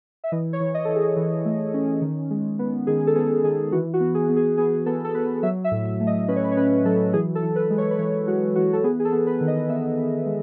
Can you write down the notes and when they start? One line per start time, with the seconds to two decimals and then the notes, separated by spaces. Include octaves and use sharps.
0.24 E5
0.32 E3 D#5
0.53 C#5
0.60 E3
0.74 D#5
0.85 E3 A4
0.96 G#4
1.16 E3
1.45 A3
1.74 C#4
2.02 D#3
2.30 G#3
2.59 B3
2.87 D#3 G#4
3.07 A4
3.16 B3 G#4
3.44 D#3 G#4
3.72 E3 F#4
3.94 F#4
4.00 B3
4.15 G#4
4.29 B3
4.36 G#4
4.58 B3 G#4
4.86 B3 A4
5.05 A4
5.14 B3 B4
5.43 F#3 E5
5.64 E5
5.71 A2
5.86 E5
6.00 A3
6.07 D#5
6.28 C#4 B4
6.36 C#5
6.44 B4
6.52 C#5
6.57 C#4 B4
6.85 F#3 A4
7.13 E3 G#4
7.35 A4
7.42 E3
7.56 B4
7.70 G#3
7.78 C#5
7.91 B4
7.99 E3 C#5
8.27 G#3 F#4
8.56 E3 F#4
8.73 A4
8.84 B3 G#4
9.00 G#4
9.05 A4
9.12 B3
9.27 B4
9.41 D#3
9.47 D#5
9.69 B3 E5
9.98 B3
10.26 G#3